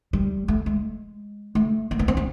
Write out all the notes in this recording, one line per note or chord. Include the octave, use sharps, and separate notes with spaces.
G3
A3
G#3
A3
A#3
B3
C4
C#4